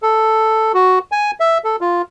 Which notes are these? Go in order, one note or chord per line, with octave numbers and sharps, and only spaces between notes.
A4
F#4
G#5
E5
A4
F4